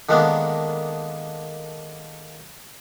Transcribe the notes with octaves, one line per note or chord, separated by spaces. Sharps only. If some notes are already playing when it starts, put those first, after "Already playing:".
D3 D#3 G#3 A#3 B3 D4